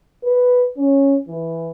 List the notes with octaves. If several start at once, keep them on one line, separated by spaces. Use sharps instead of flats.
B4
C#4
E3